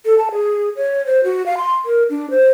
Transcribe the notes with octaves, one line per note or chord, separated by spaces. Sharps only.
A4
A5
G#4
C#5
C5
F#4
F5
C6
A#4
D4
C5